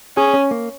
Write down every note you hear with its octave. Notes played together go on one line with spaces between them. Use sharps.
C#4 G#4
C#4
A#3